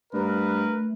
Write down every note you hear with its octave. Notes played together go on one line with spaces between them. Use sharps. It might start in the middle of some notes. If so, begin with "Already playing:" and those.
G2 A3 A#4 B4